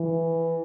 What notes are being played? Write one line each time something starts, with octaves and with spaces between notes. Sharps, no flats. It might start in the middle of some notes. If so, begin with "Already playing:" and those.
Already playing: E3